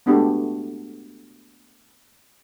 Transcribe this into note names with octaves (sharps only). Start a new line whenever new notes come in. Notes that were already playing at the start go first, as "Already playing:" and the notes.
G#3 A3 B3 D4 F#4 G4